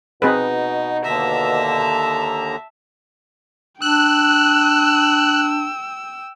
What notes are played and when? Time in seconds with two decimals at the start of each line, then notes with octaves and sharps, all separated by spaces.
0.22 B2 C4 D#4 G#4 B4
1.05 D#2 D3 E5 A5 A#5
3.82 D4 G5 E6 F#6